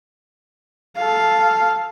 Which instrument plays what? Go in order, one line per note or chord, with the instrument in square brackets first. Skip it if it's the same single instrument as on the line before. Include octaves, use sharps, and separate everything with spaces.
[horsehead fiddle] A4 F5